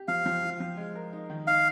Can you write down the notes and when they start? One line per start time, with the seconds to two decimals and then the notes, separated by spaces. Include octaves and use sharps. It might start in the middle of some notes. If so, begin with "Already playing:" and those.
Already playing: G4
0.08 F3 F5
0.26 F3
0.42 F4
0.60 F3
0.77 G#3
0.95 A#4
1.13 D#4
1.30 D#3
1.47 D#4 F5